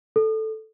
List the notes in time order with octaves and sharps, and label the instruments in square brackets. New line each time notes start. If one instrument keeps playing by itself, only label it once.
[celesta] A4